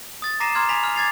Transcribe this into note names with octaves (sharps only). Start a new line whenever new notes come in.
D#6 A6
A#5 D6 A#6 C7 D#7 E7
A#5 C6 F6 G#6
G#5 B5 B6 F7
B5 F6
D6 G#6 A6 C7 F7